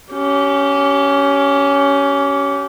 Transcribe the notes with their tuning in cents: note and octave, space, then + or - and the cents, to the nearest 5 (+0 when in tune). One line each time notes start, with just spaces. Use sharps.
C#4 +15 G4 -25